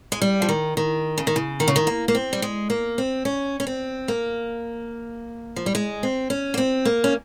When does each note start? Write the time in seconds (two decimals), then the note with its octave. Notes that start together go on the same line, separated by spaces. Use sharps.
0.12 G#3
0.22 G3
0.42 F3
0.49 D#3
0.77 D#3
1.18 C#3
1.27 D#3
1.36 C#3
1.60 D#3
1.68 C#3
1.76 D#3
1.87 A#3
2.08 A#3
2.15 C4
2.33 G3
2.42 G#3
2.70 A#3
2.98 C4
3.25 C#4
3.60 C#4
3.67 C4
4.08 A#3
5.56 F3
5.66 G3
5.75 G#3
6.03 C4
6.30 C#4
6.54 A#3
6.57 C4
6.85 A#3
7.04 C#4